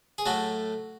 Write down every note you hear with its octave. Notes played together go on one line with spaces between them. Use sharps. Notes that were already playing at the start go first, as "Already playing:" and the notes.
G#4
A2 F#3 A3 F#4